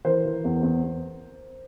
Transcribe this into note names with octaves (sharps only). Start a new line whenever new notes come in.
E3 A#4 C5
E3
E2
E2
E2